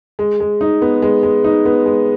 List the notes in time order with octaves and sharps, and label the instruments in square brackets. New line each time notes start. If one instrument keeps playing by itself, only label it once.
[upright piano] G#3
G#3
D#4
B3
G#3
G#3
D#4
B3
G#3